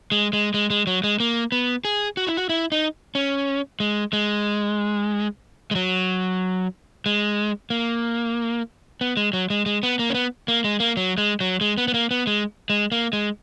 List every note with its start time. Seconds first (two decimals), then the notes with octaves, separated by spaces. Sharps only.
0.12 G#3
0.33 G#3
0.54 G#3
0.70 G#3
0.87 F#3
1.04 G#3
1.20 A#3
1.52 B3
1.85 G#4
2.17 F#4
2.27 E4
2.37 F#4
2.49 E4
2.72 D#4
3.15 C#4
3.80 G#3
4.13 G#3
5.71 G#3
5.75 F#3
7.06 G#3
7.70 A#3
9.01 B3
9.17 G#3
9.33 F#3
9.50 G#3
9.66 G#3
9.83 B3
9.99 A#3
10.10 C#4
10.14 B3
10.48 A#3
10.64 G#3
10.80 A#3
10.97 F#3
11.18 G#3
11.41 F#3
11.61 G#3
11.78 B3
11.88 B3
11.94 A#3
12.11 B3
12.27 G#3
12.70 G#3
12.92 A#3
13.13 G#3